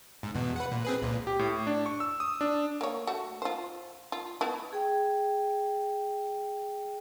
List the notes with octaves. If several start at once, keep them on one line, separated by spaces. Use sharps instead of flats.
G#2
E2 B2
B4 F#5
A#2
C4 G#4 B4
C#2 A#2
G4
A2
D4
C#6
E6
D#6
D4
A#3 C#5
A3 F#4
F4 C5
F4
B3 E4
G#4 G5